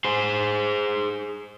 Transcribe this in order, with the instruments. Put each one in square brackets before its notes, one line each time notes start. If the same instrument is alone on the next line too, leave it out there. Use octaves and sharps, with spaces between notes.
[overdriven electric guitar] G#4 C5